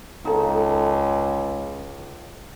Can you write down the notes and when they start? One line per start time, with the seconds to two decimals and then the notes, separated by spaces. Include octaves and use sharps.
0.25 C#2 D#4 A4